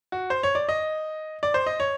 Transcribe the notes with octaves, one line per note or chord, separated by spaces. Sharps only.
F#4
C5
C#5
D5
D#5
D5
C5
D#5
C#5